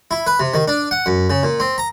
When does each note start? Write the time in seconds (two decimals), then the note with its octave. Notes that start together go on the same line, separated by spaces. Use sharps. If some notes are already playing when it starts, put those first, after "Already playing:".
0.11 E4
0.27 B4
0.40 C3
0.54 D#3
0.68 D4
0.91 F#5
1.06 F#2
1.30 C#3
1.43 A#2
1.60 C4
1.78 A#5